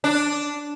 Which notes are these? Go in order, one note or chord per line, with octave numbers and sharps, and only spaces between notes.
D4